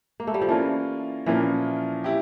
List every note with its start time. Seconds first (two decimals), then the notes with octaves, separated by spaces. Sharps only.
0.20 A#3
0.27 A3
0.34 G3
0.41 F3
0.48 E3 A#3 C#4 F4 A#4 D5
1.26 A#2 E3 F3 C#4 F4 A#4
2.04 E4 G4